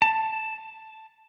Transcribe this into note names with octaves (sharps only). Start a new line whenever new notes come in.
A5